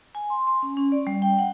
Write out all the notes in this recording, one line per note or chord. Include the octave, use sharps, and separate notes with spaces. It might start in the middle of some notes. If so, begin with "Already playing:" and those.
G#5
C6
C6
C#4
C#4
D5
G3
G5
F#5